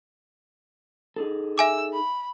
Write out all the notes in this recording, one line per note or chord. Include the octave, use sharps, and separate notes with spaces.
D#4 G#4 A4
E5 G#5 D6 E6
B5